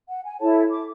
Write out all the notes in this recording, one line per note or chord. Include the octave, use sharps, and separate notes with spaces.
F#5
G#5
E4 A4 C#5 A5
D6